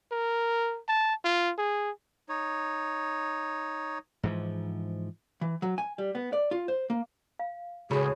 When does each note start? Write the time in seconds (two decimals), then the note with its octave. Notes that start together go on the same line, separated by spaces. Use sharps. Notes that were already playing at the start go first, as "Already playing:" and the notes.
0.12 A#4
0.88 A5
1.25 F4
1.58 G#4
2.29 D#4 C#5
4.23 G#2 E3 F3
5.41 E3
5.62 F#3
5.78 G#5
5.98 G3
6.15 B3
6.33 D5
6.51 F4
6.68 C5
6.90 A#3
7.39 F5
7.91 C#2 A2 C#3 F#4 G#4 B5